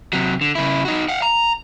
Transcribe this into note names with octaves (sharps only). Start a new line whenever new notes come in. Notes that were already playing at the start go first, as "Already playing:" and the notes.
C3 F#3
D3
C#3 E4
D#4 F#4
F5 F#5
A#5